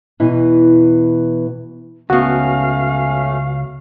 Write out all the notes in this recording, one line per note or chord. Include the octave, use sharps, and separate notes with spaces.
E2 B2 E3 E4
C#2 A3 B3 C#4 F#4 F5